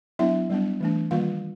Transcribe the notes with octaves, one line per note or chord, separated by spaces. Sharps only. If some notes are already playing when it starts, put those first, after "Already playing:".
F#3 B3 D4 E4 E5
G3 B3 D4
E3 A3 D4
D#3 G3 A#3 F4 F5